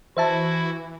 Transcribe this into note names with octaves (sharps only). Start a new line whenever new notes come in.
E3 E4 F#4 C5 E5 A5